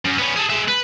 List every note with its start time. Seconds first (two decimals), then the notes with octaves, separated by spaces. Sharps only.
0.05 F#2
0.19 B3 C#4
0.36 G#4 A4
0.50 G#3 E5
0.68 B4